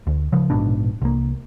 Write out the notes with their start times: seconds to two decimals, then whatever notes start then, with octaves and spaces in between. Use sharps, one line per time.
0.07 D2
0.32 C#3 F3
0.50 A#1 G#2 B2 D4
1.02 C2 A#3